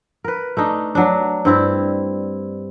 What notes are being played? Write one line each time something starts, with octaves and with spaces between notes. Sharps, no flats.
A#4 B4
A3 D4 D#4
F#3 D4
G2 C4 E4